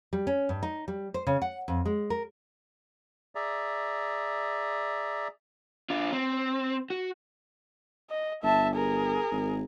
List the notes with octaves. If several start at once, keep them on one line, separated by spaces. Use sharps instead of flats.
G3
C#4
G2
D#4
G3
C5
C#3
F#5
F2
G#3
A#4
G#4 D5 E5 A#5
D4 F4
C4
F#4
D#5
G1 E5 A5
G#4 A#4
G#1